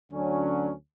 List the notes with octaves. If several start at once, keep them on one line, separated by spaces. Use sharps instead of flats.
D2 D3 F#3 C#4